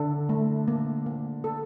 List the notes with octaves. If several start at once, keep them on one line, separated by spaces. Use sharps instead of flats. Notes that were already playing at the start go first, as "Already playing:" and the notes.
Already playing: D3 A4
A3
A#3
A#3
A4